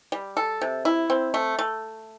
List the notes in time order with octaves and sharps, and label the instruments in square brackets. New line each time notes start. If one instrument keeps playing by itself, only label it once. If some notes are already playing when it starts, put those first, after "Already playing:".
[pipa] G3
A4
C3
E4
C4
A3
A3